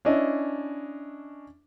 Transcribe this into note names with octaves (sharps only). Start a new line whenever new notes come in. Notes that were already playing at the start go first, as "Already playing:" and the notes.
C#4 D4 E4 D#5